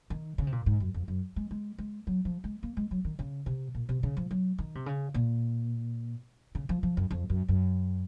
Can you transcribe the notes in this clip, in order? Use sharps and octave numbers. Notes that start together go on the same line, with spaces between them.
D#3
C#3
C3
A#2
G#2
F#2
F2
F#2
G#3
G#3
G#3
F#3
F3
G#3
A#3
G#3
F#3
D#3
C#3
C3
A#2
C3
C#3
F3
F#3
D#3
C3
C#3
A#2
C#3
F3
F3
F#2
F2
F#2
F#2